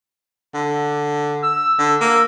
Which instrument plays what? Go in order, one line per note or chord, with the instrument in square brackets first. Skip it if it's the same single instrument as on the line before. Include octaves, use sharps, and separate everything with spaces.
[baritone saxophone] D3
[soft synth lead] E6
[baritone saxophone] D3
A#3